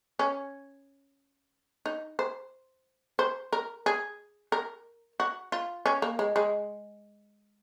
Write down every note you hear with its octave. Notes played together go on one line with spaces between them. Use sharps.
C#4
D#4
C5
C5
A#4
G#4
A#4
F#4
F4
C#4
A#3
G#3
G#3